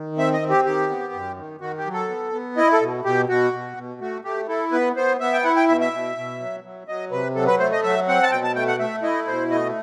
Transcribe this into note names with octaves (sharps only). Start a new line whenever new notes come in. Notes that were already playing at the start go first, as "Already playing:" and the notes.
Already playing: D#3
C4 E5
D#5
C4
G4
D#3 G4
B3
F#2
D#3
D#3 F#4
G4
F#3
A4
B3
B3
E4 D#5
A4
B2
B2 G4
B2 F#4
B2
B2
A3 F#4
A3 G4
E4 A4
B3 B4
B3 C5
B3 E5
G5
E4 F#5
G5
B2 E5
E5
B2
B2
F#3
F#3
F#3 D#5
C3 B4
F#3 A4
B4
A3 C5
D#5
F#3 E5
C4 F#5
A5
B2 G5
A5
A3 G5
F#5
A3 E5
E4 D#5
B2 C5
A3 D#5